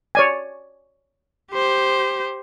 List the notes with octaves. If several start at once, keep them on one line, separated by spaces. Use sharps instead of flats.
C#5 D5 G#5
G4 C5